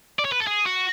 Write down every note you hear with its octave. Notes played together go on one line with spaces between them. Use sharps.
D5
C#5
B4
A4
G#4
F#4